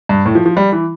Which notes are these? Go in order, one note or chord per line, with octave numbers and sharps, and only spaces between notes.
G2
A2
F3
F3
G3
E3